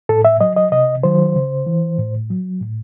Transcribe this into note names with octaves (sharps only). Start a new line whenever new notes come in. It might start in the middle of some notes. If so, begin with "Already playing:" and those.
A2 A4
E5
F#3 D#5
D#5
C3 D#5
D#3 F#3 C5
C#3
E3
A2
F#3
A2